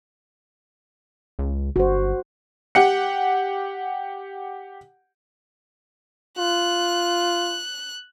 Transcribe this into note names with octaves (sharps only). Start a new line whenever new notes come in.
C#2
G1 F#4 C5
G4 F#5 C#7
F4 F#6